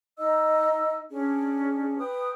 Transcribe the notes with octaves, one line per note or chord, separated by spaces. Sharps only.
D#4 D#5 E6
C#4 D4 G#4
B4 G5 D#6